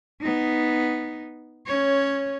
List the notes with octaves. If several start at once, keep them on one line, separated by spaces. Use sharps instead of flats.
B3 D#4
C#4 C#5